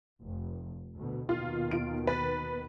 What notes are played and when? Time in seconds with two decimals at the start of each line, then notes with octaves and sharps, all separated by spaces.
0.21 F1
0.94 D2 B2
1.29 D#2 B2 D#3 F4
1.71 F4 D7
2.07 B4 A6